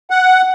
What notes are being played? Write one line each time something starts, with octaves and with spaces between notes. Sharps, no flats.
F#5